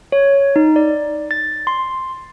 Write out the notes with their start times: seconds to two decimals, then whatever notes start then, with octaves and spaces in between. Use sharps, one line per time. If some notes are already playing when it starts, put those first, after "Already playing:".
0.12 C#5
0.56 D#4
0.76 D5
1.31 A6
1.67 C6